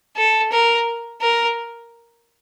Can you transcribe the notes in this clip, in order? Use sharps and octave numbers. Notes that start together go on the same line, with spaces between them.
A4
A#4
A#4